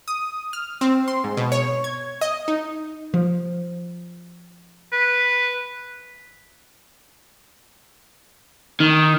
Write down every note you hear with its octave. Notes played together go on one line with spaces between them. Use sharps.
D#6
F6
C4
C6
G#2
B2
C#5
G#6
D#5
D#4
F3
B4
D#3